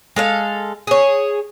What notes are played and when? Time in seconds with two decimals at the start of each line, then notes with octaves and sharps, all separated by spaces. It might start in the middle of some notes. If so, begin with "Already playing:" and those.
0.16 G#3 A4 F5
0.87 G#4 C#5